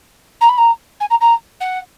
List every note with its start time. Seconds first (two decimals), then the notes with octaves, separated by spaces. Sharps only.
0.41 A#5
0.49 B5
0.58 A#5
1.00 G#5
1.10 A#5
1.21 A#5
1.60 F#5